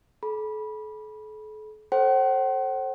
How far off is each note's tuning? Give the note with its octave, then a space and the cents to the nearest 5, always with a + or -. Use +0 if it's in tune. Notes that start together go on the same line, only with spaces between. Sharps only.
A4 -40 B5 -20
A4 +0 C5 +30 F#5 +45